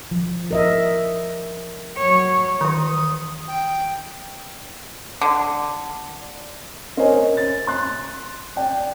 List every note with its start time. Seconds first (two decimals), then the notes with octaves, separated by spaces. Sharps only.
0.11 F3
0.51 A#4 D#5 E5
1.97 F#3 C#5
2.61 D#3 E3 D#6
3.48 G5
5.21 D3
6.97 C#4 A#4 C5 C#5 D#5 G#5
7.37 A6
7.67 C6 F#6 A6
8.56 D5 G5